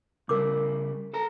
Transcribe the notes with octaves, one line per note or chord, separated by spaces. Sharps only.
C#3 G3 A#4 D6
A4 A5 A#5